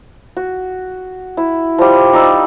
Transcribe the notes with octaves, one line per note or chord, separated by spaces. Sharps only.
F#4
E4
F3 G3
D#4 D5 E6